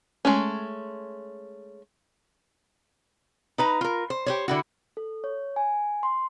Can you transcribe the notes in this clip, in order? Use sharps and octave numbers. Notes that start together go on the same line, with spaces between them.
G#3 A3 C#4
D#4 B4 A#5
F4 A#4
C5
G4 C5 C#5
D3 E4 F#4
A4
C#5
G#5
C6